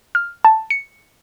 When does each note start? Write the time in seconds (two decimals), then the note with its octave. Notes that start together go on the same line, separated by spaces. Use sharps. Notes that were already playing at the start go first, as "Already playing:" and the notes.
0.15 F6
0.45 A5
0.70 C#7